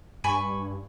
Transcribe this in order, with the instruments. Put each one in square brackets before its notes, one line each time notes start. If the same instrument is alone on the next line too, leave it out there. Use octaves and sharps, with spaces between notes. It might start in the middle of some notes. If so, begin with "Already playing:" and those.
[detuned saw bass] G2 [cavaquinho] G#5 B5 C#6